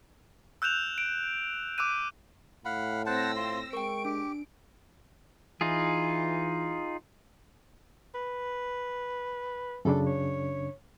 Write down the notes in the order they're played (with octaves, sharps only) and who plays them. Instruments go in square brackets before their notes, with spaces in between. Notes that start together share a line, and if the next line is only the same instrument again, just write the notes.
[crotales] E6 F#6 G6 E7 F7
D7
D6 E6 F#6 D#7
[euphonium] A2 [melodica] F5 F#5 B5
[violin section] C4 E6 A#6 [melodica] C5 F#5 A5
[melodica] F4 C6
[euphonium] G#3 [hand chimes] A#4 G5 [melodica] C#6 [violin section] D7
[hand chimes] D4 [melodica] G4
[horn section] E3 [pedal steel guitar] D#4 F4 G#4
[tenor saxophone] B4
[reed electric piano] F#2 C#3 D4 [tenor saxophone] A4
[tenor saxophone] C#5